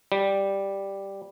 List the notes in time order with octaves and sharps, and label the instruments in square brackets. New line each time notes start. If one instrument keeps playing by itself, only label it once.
[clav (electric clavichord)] G3